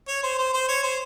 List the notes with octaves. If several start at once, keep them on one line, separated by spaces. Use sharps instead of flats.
C#5
C5
C5
C5
C#5
C5